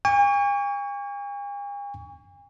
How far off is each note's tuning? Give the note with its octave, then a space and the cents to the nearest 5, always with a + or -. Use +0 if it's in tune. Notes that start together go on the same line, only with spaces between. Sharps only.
G#5 -45 C#6 +25